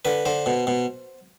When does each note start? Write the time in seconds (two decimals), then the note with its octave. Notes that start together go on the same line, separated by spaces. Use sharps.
0.05 D3 B4
0.25 D3 C5
0.46 B2
0.67 B2